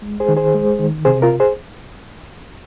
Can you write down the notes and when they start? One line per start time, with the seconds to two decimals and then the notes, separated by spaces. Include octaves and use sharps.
0.02 G#3
0.20 G#4 C5
0.28 D#3
0.37 G#4 C5
0.55 G#3
0.79 D#3
1.05 C3 G#4 C5
1.22 F4 A#4
1.40 G#4 C5